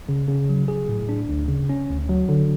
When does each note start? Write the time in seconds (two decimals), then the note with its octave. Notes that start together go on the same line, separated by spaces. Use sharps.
0.09 C#3
0.28 C#3
0.49 F#3
0.68 G#4
0.88 A2
1.09 D4
1.29 D2
1.48 C#3
1.69 C#4
1.89 D2
2.09 F#3
2.29 D3